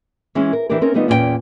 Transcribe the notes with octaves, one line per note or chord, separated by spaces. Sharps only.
E3 G#3 C#4
A#4
E3 D4 D#4 G4 A#4
C4 C#4 D#4 A#4
D#3 G3 A3 B3 D#4 F4
E2 A#2 C#4 F4 G5